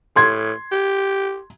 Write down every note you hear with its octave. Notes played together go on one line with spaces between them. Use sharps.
A2 C6 G#6
G4